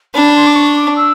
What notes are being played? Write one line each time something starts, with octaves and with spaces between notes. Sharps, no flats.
D4 B5
C6
D6
C#6
D6
E6